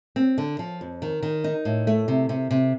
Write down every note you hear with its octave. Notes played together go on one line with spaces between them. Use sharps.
C4
D3
F3
F2
D#3
D#3
D#4
A2
A3
C3
C3
C3